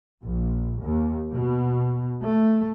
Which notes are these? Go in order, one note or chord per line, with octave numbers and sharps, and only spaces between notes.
A#1
D#2
B2
A3